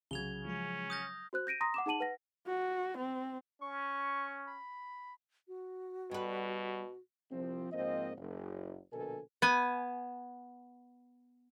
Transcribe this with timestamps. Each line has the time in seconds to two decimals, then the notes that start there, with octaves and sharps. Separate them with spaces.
0.11 C2 C#3 F#3 G#4 G#6 F7 G7
0.45 F3 G#3 C#4 G#4
0.90 D#6 F6 G6 A#6
1.33 F#4 C5 F#6
1.47 G6 A#6 D7 D#7
1.61 A#5 C6 D#6 A#6
1.74 F#5 D6 E7
1.86 D#4 G#4 F#5 A5 D#7 F#7
2.00 B4 F#5 A#6
2.47 F#4
2.97 C4
3.62 C#4 C#6
4.47 B5
5.48 F#4
6.11 B2 G3 B4
7.30 C2 F3 C4
7.72 G#2 F3 A#3 C4 D#5
8.17 F#1
8.92 A#1 B2 D3 A4 A#4 G#5
9.42 B3 G#5